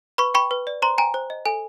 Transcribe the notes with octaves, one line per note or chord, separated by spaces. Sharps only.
B4 B5 C#6
G5 B5 C#6
B4
D5
C5 A#5 C6
G5 G#5 A#5
C5
D#5
A4 G#5